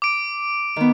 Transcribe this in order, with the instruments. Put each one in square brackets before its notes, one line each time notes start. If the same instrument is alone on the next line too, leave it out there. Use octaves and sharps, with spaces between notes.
[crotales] D6 D7
[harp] D#3 B3